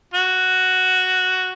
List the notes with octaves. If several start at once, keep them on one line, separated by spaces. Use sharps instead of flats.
F#4